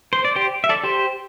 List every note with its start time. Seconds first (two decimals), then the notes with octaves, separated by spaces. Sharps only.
0.13 C5
0.25 D5
0.36 G4 C5
0.64 E5
0.69 A4 D5
0.84 G4 C5